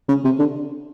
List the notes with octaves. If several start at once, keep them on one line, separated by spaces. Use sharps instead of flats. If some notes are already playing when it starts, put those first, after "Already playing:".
C#3
C3
D3